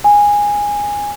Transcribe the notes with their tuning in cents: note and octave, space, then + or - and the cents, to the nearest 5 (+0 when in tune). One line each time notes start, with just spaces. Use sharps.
G#5 -15